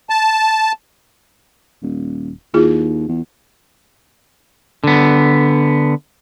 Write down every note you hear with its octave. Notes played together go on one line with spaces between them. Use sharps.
A5
D#1
D#2 E4 F4 G#4
E2
D3 B3